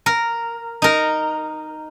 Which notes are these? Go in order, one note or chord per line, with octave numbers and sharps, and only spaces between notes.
A#4
D#4 A#4